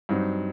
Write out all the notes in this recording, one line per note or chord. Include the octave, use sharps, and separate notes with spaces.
G2 F#3 C4 D#4